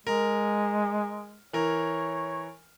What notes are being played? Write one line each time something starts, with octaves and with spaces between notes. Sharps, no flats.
G#3 A#4
E3 A#4 C#5